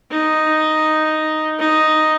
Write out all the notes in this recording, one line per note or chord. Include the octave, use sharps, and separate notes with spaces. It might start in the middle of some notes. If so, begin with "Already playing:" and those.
D#4
D#4